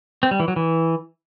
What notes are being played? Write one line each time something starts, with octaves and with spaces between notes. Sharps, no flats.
C4
G3
E3
F#3
E3